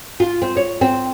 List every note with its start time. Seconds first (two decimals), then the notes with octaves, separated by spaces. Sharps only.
0.20 F4
0.42 C4
0.57 C#5
0.81 C4